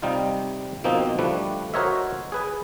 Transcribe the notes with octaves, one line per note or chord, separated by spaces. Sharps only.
C3 G3 D#4 F4
B2 F3 A#3 C4 D#4
F3 G3 A3 D4 B4
F#4 A#4 C5 C#5 D#5 E5
G#4 B4 G#5